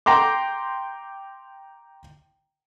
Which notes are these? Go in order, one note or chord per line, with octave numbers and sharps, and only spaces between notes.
G5 A#5 C6 D6